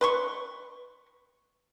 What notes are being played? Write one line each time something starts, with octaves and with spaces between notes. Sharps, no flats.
B4 C6 C#6